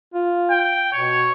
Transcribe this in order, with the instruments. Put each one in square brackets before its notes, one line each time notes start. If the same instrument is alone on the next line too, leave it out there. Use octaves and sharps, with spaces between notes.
[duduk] F4
[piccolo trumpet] G5
[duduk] B2 [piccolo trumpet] C#5